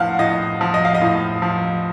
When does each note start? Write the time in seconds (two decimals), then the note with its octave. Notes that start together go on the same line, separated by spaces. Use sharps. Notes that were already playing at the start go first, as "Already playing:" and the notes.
Already playing: A2 F3 F5 F#5
0.19 A2 D#5
0.61 F3
0.74 D#5
0.85 F5
0.95 D#5
1.02 A2
1.42 F3